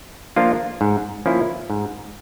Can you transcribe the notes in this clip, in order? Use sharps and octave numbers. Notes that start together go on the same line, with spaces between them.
F3 A#3 D4 F4
G#2
F3 A#3 C#4 E4
G#2